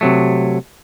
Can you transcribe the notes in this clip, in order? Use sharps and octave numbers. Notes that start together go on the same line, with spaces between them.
C3 F#3 A3